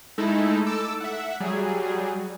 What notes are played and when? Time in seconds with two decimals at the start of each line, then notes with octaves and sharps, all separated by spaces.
0.18 G#3 A3 D#4 E4 A4
0.66 A4 A5 D6 E6
1.00 E5 F#5
1.40 F#3 G3 G#4